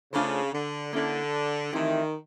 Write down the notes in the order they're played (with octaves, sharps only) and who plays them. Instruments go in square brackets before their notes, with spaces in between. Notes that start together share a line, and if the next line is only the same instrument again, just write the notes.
[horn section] C#3 [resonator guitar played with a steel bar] A3 D4 F4 A4 C5
[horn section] D3
[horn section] D3 [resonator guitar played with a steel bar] A#3 C#4 E4 A4
[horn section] D#3 [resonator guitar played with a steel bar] E3 A3 C4 E4 G4